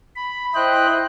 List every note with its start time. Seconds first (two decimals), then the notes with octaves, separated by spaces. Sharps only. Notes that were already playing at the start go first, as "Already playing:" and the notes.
0.16 B5
0.55 E4 C5 D#5 G5 F#6